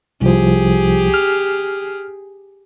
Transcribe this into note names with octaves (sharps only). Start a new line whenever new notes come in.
C2 F3 G4 G#4
F6